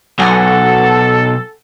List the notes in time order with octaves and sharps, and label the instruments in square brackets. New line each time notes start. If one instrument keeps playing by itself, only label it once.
[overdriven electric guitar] B1 [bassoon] F#4 [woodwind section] A4 [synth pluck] F#5 G#5 A#6